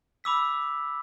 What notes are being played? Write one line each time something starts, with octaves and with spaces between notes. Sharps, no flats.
B5 D6 E6 B6